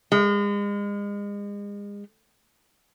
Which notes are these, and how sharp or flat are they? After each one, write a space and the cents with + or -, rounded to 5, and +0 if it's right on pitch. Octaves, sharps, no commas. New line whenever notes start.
G#3 -35